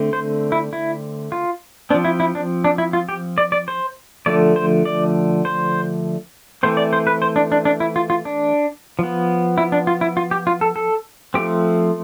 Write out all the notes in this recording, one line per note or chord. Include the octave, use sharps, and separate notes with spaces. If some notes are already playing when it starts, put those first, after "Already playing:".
Already playing: D3 A3 C4
C5
E4
E4
F4
F3 C4 D4
E4
E4
D4
D4
E4
F4
G4
D5
D5
C5
D3 F3 A3 D5
C5
D5
C5
E3 A3 C4 C5
D5
C5
B4
C5
D4
D4
D4
E4
F4
F4
D4
F3 B3
E4
D4
F4
E4
F4
G4
F4
A4
A4
F3 A3 C4 G4